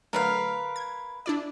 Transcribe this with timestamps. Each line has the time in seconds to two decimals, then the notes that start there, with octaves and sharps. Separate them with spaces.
0.13 D3 F#3 A3 A#4 B4 F5
0.76 G#6
1.26 D4 E4 D5